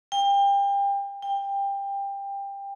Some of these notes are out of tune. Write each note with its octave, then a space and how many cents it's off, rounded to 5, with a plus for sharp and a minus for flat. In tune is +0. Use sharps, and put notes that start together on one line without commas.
G5 +30
G5 +20